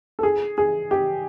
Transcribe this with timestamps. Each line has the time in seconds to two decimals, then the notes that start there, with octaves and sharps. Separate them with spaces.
0.19 A4
0.23 G#4
0.58 G#4
0.91 G4